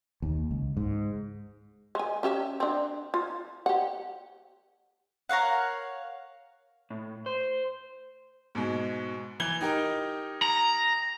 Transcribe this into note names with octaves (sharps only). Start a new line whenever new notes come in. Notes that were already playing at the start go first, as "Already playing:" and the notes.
D#2
C#2
G#2
G#3 G#5
C#4 G4 E5
C4 D4
F4
G4 F#5
A#4 C#5 F5 F#5
A2
C5
G#2 B2 G#3
E3 G#6 G7
D#4 G4 A#4
A#5